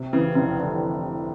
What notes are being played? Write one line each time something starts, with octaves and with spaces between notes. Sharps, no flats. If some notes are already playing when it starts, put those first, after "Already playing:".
Already playing: C3
C#3 E3
F1 C#3
D3